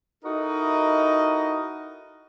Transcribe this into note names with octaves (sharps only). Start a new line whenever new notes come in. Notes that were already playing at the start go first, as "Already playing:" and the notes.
D#4 E4 F#4 A4 A#4 D#5